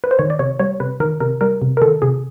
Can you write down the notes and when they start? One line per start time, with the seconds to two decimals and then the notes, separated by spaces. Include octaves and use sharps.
0.04 B4
0.11 C5
0.19 D#3 C#5
0.30 D5
0.39 C3 C#5
0.60 G3 C#5
0.80 C3 B4
1.00 D#3 A#4
1.20 C3 A#4
1.41 G3 A#4
1.62 C3
1.77 A#4
1.82 D#3 A4
2.02 C3 G#4